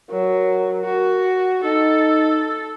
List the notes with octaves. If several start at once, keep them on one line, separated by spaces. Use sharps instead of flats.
F#3 A#4
F#4
D#4 A4